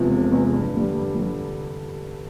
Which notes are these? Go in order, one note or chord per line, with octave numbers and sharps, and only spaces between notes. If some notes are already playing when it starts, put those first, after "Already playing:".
Already playing: F1 E2 C3 F3 G#3
F1
E2 C3 F3 G#3
G2
D3 G3
G2
D3 G3